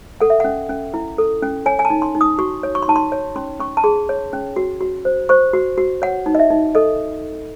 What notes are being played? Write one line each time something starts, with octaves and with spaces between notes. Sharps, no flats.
A4 F#5
E5
C#4 F#5
C#4
E4
A4
C#4
C#5 G#5
G#5
A5
D#4
C6
D#4
D#6
F#4 C#6
C#5
C#6
C6
D#4 A5
C6
C#5
C#4 C6
C#4 C#6
A5
G#4 C6
C#5
C#4
F#4
F#4
C5
C5 C#6
F#4
F#4
C#5 F#5
D#4
D#5
E5
D#4
A4 D#5